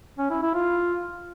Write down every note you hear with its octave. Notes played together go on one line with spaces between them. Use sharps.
C#4
E4
E4
F4